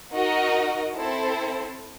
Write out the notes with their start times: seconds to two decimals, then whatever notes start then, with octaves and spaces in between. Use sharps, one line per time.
0.13 D#4 F#4 A#4 D#5 F#5
0.96 C4 E4 A4 C5